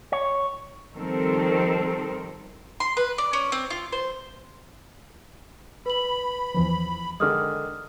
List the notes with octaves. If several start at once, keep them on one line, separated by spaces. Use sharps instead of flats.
C#5
D#3 F3 G3 C4 A4 A#4
C6
B4
D5
C#4
C4
F4
C5
B4 B5 F#7
E2 E3 F3
D3 D#3 G#3 D#6 F6